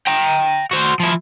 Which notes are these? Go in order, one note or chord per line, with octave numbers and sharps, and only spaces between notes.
G5 A#5
F#4 C5
F3 E4